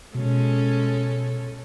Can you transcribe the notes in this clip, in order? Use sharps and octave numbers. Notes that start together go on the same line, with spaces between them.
B2 G#3 C#4 A4